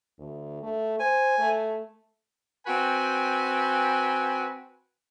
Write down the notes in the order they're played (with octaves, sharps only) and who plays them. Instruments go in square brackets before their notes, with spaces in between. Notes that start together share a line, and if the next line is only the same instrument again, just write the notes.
[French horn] D2
A3
[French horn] C5 [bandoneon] G#5
[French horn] A3
[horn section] C4 F#4 B4 G5 G#5